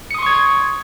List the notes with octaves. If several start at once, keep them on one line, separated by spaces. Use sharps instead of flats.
C6 C#6 D#6 G#6 C#7